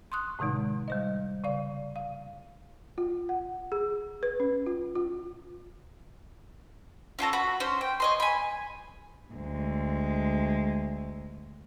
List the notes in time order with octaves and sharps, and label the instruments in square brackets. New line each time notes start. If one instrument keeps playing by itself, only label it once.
[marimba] C6 C#6 D#6 F#6
A2 C3 D#3 G#3 D#4
G3 C5 D#5
C#3 D5 F5
F5
[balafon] F4
F#5
G#4
B4
C#4
F4
F4
[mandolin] C#4 F4 A4 A#5
F#4 B5
C#4 C5
G5
C#5 D#5 C6
G#5 B5
[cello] D2 G#3